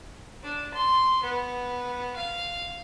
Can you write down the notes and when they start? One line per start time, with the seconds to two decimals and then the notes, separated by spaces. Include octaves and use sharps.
0.43 D4
0.74 C6
1.23 B3
2.16 F5